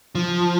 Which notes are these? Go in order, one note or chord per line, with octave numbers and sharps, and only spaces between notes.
F3